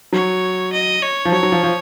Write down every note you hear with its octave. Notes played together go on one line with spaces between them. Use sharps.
F#3 C#5
D#5
C#5
F3
F#3 C#5
F#3
F3
F3